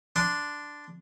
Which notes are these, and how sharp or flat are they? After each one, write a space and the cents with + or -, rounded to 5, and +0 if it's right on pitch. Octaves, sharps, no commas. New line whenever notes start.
D4 +0 C6 -20